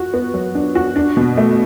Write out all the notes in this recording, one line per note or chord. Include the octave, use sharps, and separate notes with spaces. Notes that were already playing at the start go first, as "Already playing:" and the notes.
Already playing: F#4
B3
F#3
D4
F#4
D4
B2
A3